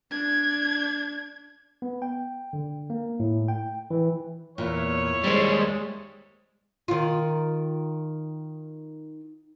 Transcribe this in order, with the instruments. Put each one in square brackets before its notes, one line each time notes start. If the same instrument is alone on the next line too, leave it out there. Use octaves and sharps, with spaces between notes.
[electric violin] D4 G#6
[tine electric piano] B3
G5
D3
A#3
A2
G5
E3
[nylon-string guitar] E2 A#2 [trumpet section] E4 C#5
[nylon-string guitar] D#2 C5 [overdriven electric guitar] G3 G#3
[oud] D#3 F4